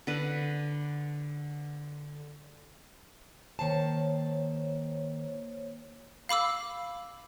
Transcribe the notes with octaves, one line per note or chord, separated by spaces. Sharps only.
D3 B4
D#3 A#3 C5 C#5 A5
F5 B5 D6 E6